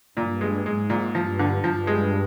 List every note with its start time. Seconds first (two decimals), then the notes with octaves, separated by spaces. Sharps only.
0.17 G2 A#2
0.41 G#3
0.66 G#2 G#3
0.90 A#2
1.14 G2 F3
1.39 D3
1.63 G2 F3
1.87 G#3